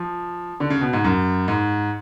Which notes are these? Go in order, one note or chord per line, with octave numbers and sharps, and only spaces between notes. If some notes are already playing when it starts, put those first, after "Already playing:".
Already playing: F3
D3
C#3
B2
G#2
F#2
G#2